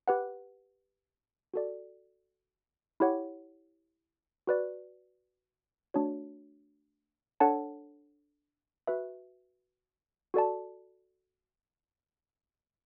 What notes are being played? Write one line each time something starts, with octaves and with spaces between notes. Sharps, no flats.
G4 B4 F#5
F#4 A4 D5
E4 G4 C#5 F#5
F#4 B4 D5
A3 D4 F#4 C#5
D4 A4 C#5 F#5 A5
F#4 B4 E5
F#4 A4 D5 A5